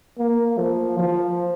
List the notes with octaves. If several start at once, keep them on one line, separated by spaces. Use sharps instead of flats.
A#3
F3
F3